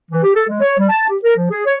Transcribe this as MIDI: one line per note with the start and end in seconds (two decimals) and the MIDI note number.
0.12 0.23 52
0.23 0.33 67
0.35 0.43 69
0.49 0.58 56
0.60 0.76 73
0.78 0.88 55
0.90 1.06 81
1.09 1.18 67
1.24 1.34 70
1.37 1.48 53
1.51 1.61 68
1.66 1.74 73